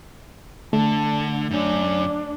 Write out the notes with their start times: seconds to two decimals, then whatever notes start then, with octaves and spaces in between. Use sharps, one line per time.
0.73 D3 A3 A5
1.51 F#2 C#4 D4